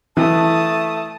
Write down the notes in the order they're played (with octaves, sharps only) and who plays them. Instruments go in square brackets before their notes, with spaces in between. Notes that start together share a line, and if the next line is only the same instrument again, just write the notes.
[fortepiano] E3 [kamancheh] A3 D#6 [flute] A5